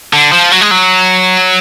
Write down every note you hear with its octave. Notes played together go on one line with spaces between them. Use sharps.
D3
F3
F#3
G#3
F#3